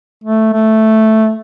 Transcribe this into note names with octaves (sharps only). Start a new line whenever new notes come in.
A3
A3